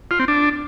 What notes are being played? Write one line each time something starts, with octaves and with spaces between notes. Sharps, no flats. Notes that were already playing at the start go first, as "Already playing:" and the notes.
F4
C4
D4